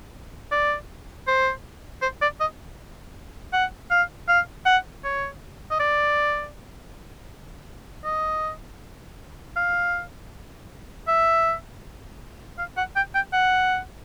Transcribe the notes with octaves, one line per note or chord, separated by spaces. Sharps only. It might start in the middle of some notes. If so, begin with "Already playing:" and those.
D5
C5
C5
D5
D#5
F#5
F5
F5
F#5
C#5
D#5
D5
D#5
F5
E5
F5
F#5
G5
G5
F#5